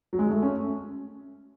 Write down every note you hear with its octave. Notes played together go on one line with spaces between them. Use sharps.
F#3
G#3
A3
C#4